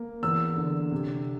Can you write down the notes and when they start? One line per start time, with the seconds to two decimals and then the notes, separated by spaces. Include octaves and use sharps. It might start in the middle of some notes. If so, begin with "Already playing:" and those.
Already playing: A#3
0.23 E2 E6
0.56 D3
0.92 C3